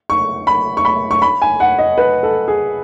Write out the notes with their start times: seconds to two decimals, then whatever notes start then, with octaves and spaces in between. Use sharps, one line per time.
0.10 C#6
0.47 B5
0.77 C#6
0.85 B5
1.11 C#6
1.22 B5
1.42 G#5
1.60 F#5
1.78 D#5
1.98 B4
2.23 A4
2.48 G#4